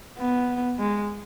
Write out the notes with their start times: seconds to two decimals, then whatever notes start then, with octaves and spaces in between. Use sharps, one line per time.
0.19 B3
0.79 G#3